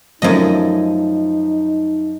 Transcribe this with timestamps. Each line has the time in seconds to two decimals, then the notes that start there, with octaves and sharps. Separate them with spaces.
0.22 F#2 F3 A3 D#4 D#5